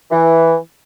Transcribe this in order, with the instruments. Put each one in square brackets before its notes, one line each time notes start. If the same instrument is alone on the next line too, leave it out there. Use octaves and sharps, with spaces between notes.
[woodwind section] E3